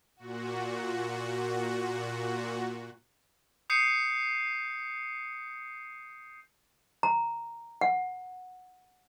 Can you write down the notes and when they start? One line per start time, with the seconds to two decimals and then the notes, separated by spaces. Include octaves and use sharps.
0.17 A#2 F#4
3.70 D#6 G6 C7 C#7 D#7
7.03 A#5
7.81 F#5